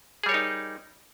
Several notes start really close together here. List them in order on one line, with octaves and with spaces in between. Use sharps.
G#4 G3 C#5 A#4 D#4